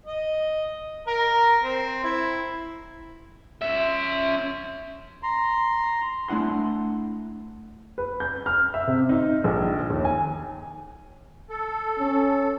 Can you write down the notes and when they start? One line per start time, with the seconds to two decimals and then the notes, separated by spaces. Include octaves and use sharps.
0.06 D#5
1.07 A#4 A#5
1.63 C4
2.04 E4
3.62 C#4 E5
5.23 A#5 C6
6.28 A3 D4 E4 F#5 C6
7.98 B4
8.20 G6
8.46 F6
8.74 E5
8.87 C3
9.09 D#4
9.44 A#1
9.90 D#2
10.05 G#5
11.50 A4
11.99 C#4